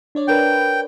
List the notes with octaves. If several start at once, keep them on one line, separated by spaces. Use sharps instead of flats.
D4 C#5 D5
D4 A#4 B4 G5